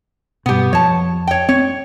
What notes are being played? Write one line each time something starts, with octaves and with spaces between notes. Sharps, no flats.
G2 B2 B3 G4
F2 C#5 A5
C#5 G5
C4 C#5